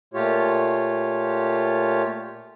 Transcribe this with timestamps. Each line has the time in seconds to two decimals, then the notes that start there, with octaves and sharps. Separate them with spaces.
0.14 A#2 A3 F4 G4 C#5